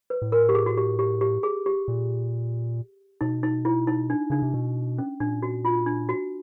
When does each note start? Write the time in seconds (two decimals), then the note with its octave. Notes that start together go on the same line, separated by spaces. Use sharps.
0.10 B4
0.22 A2
0.32 A#4
0.49 G4
0.55 G#4
0.66 F#4
0.77 G4
0.99 G4
1.21 G4
1.43 G#4
1.66 G4
1.88 A#2
3.21 B2 D#4
3.43 D#4
3.65 E4
3.87 D#4
4.10 D4
4.30 C#3 D4
4.42 C3
4.54 B2
4.98 C#4
5.20 A#2 D4
5.43 F#4
5.65 F4
5.86 D4
6.09 F#4